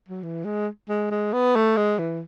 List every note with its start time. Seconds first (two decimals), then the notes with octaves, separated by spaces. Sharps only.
0.09 F#3
0.23 E3
0.45 G#3
0.89 G#3
1.11 G#3
1.33 B3
1.55 A3
1.77 G#3
1.99 E3